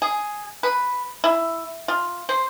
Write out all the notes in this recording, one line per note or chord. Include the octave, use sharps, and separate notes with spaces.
G#4
B4
E4
F4
C5